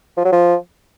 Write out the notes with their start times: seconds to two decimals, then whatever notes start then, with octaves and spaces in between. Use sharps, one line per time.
0.17 F3
0.25 F#3
0.32 F3